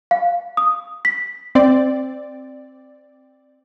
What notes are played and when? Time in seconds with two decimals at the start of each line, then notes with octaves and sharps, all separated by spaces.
0.11 F5
0.57 D#6
1.05 B6
1.55 C4 D5